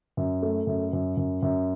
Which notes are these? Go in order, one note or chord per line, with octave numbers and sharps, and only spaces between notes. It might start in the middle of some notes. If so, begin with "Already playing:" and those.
F#2
A3
F#2
F#2
F#2
F#2